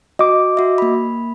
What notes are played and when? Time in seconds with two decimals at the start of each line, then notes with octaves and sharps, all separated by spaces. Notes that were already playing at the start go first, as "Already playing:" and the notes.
0.19 F#4 D#5 D6
0.57 F#4 E5
0.78 A#3 B5